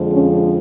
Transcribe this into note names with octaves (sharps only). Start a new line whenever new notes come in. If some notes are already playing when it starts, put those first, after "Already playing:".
Already playing: F2 D3 F3 G#3
C#4